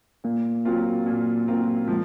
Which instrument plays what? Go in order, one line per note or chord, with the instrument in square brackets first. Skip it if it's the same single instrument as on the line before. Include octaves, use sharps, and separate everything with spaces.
[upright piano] A#2 [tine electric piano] A#3
[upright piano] F#3 C4 F4 A#4
A#2
F#3 C4 F4 A#4
[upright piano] F3 [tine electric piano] G#3